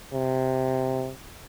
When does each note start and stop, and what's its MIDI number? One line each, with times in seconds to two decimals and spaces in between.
0.13 1.11 48